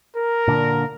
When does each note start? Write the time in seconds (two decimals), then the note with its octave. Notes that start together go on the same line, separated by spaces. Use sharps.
0.16 A#4
0.48 A#2 D3